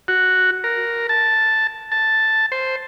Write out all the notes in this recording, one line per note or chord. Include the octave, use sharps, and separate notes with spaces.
F#4
A#4
A5
A5
C5